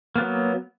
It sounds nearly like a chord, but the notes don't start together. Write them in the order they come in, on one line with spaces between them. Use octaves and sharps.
A#3 B3 F#3